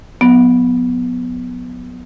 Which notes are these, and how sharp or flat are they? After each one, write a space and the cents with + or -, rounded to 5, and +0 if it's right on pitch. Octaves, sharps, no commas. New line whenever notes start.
F#3 -45 B3 +0